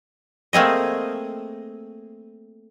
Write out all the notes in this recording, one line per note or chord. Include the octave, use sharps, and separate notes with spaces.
A3 A#3 C4 G#4 D#5